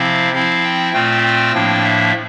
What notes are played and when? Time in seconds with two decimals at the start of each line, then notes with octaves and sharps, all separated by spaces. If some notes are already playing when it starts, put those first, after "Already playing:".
Already playing: C3 F3 C4 E4 F5
0.32 F3 C4 E4 F5
0.63 G5
0.93 A#2 A3 C4 F4 G5
1.22 G5
1.52 A2 F3 A#3 D4
1.83 E5